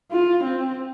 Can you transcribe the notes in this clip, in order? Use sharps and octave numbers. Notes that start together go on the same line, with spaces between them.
F4
C4